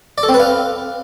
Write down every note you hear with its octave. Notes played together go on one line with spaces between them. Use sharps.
D5
A4
C4
B4
F5